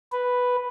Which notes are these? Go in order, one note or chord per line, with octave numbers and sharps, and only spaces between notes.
B4